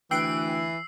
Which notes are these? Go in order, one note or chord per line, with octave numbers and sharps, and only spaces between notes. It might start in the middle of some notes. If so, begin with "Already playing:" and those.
D2 E3 G5 E6 F#6 C7 D7